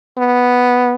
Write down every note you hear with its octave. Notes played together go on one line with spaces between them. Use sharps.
B3